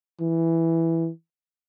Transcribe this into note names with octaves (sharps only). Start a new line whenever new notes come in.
E3